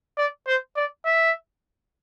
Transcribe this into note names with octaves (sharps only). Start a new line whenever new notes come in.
D5
C5
D5
E5